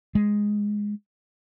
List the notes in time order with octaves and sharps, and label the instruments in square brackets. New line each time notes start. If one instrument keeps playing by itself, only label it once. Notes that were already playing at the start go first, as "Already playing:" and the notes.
[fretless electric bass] G#3